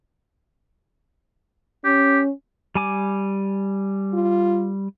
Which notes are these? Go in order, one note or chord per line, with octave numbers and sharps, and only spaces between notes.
C#4 G4
G3 G#5 D6
F4